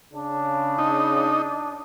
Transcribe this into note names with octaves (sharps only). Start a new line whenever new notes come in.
C#3 D4
D#4